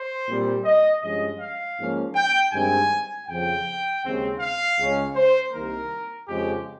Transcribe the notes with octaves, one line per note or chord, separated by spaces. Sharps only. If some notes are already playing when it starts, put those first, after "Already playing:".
Already playing: C5
A#2 G3 C4
D#5
G2 F3 G#3 C#4 D#5
F5
G#2 F3 A#3 C#4
G5
G2 D#3 G#3 C4 G#5
F2 C#3 F3 G5
D#2 C#3 G#3 C4
F5
C#2 C#3 G#3 C#4
C5
C2 C3 D#3 A#3 A#4
F2 C#3 F3 G#3 G4